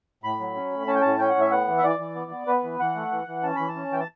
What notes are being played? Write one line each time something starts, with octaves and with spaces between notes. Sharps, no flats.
A2 B5
F#3
C#4
A2
C#4 A5
G5
A2 A5
C#4 G5
F#5
A2
E5
B3 F#5
E3
E5
E3 D5
E3
B3
B3
B3 B4
E3
E3 F#5
A3
E3
E3
C#4 A5
E3 B5
A5
C#4
E3 G5
A5